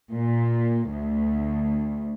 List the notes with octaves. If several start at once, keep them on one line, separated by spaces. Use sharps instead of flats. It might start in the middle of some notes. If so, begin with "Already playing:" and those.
A#2
D2